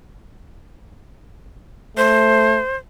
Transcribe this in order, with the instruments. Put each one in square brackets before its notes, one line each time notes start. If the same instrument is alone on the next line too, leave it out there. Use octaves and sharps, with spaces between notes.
[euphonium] A3 [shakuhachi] C5